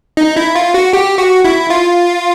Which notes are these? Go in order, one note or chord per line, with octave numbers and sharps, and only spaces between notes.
D#4
E4
F4
F#4
G4
F#4
E4
F4